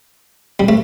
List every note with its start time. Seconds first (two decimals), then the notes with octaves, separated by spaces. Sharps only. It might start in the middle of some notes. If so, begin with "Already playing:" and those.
0.60 G3
0.69 A3